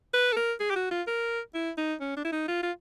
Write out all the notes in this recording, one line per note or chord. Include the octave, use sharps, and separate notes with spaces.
B4
A4
A#4
G#4
G4
F#4
F4
A#4
E4
D#4
C#4
D4
E4
D#4
F4
F4